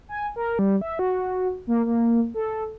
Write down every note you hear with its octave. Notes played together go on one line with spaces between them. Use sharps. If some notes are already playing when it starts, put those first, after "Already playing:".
G#5
A#4
G3
E5
F#4
A#3
A#3
A4